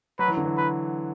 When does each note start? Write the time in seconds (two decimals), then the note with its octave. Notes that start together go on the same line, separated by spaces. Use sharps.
0.19 F#3 B4
0.28 E3
0.37 D3
0.45 E3
0.57 B4